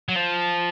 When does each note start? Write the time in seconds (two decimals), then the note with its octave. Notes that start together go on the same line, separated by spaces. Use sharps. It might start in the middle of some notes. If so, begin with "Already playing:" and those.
0.09 F#3
0.16 F3